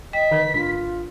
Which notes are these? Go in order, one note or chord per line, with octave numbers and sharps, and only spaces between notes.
D#5 G5 B6
D3 D#3 A#4 B4
G#1 D4 F4